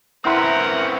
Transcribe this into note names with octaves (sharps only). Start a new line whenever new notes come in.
C4 C#4 E4 A#4 B4 F#5 C6